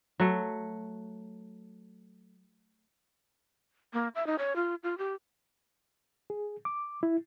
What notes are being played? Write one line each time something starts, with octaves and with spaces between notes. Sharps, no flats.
F#3 A3
A#3
E5
D#4
C#5
F4
F4
G4
G#4
D6
E4